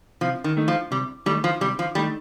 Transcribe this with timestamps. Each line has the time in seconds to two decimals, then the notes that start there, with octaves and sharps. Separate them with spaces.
0.21 C3 F3
0.44 D#3
0.57 D#3 A3 D#4
0.68 F3
0.91 C3 G3
1.26 D#3 G3 A3 D#4
1.44 F3
1.61 C3 G3
1.79 F3
1.95 D#3 G3 A3 D#4